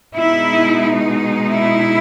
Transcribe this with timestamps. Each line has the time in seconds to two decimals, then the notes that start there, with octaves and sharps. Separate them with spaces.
0.15 B2 G#3 D#4 E4
1.48 E4